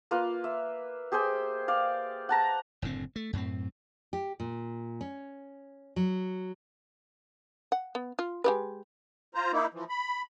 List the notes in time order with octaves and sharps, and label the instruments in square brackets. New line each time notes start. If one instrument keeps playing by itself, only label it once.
[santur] A#3 F4 B4 F5
E5
G4 G#4 C5 G5
D5 F5
F#5 A5 A#5
[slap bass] F#1 A2 D3 C4
A3
F#2 A2 A3 C4
[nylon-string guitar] G4
A#2
C#4
F#3
[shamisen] F#5
B3
F4
G#3 G4 B4
[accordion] F4 C5 A#5
A#3 D#4 E4
E3 F3
B5